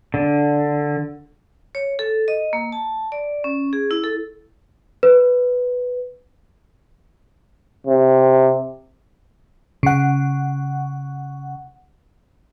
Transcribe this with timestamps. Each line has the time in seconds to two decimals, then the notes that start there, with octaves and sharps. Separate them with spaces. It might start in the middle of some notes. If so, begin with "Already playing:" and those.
0.14 D3
1.75 C#5
1.99 A4
2.28 D#5
2.53 A#3
2.72 A5
3.12 D5
3.44 C#4
3.73 G#4
3.91 E4
4.04 A4
5.03 B4
7.87 C3
9.83 C#3 F#5